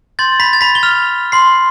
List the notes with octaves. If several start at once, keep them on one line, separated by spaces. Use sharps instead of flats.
C6 G6 A6
B5 B6
A6
B5 B6
G7
F6 F7
C6 C7